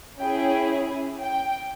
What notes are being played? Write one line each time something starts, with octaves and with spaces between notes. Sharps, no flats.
C#4 E4 G#4 G5
G5